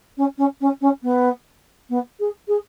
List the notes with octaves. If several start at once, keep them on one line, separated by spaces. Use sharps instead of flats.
C#4
C#4
C#4
C#4
B3
B3
G#4
G#4